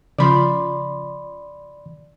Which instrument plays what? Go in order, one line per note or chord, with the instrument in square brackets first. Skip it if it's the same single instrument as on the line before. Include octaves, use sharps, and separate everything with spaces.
[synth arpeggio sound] C#3 F3 [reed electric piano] D5 B5 C6